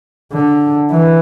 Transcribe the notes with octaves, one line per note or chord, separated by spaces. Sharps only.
D3
E3